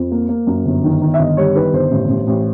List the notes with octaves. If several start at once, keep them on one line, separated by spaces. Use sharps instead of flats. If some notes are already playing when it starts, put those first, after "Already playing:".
Already playing: F2
A#3
A#3
F#2
G1
D#3
D#3
E5
G1 D#5
G3 C#5
D#3 B4
G1 C5
A1
A1
A1